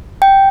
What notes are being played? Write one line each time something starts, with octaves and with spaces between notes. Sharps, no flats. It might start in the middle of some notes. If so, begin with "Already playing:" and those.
G5